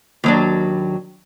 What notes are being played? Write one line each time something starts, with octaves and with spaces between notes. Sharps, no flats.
D#2 F#3 D4